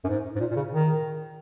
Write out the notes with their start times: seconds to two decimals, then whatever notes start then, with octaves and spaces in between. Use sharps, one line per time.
0.04 F#2
0.08 G#2
0.36 G#2
0.40 A#2
0.51 A#2
0.56 C#3
0.72 D#3